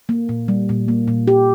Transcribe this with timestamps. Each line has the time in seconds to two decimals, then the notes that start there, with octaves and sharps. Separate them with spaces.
0.09 A#3
0.29 A#2
0.48 G3
0.69 A#2
0.88 A#3
1.08 A#2
1.28 G4